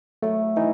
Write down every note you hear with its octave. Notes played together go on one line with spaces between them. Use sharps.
F#3 A3
E3 D#4